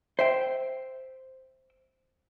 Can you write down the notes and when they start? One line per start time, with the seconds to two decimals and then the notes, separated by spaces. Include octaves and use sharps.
0.19 C5 E5 G5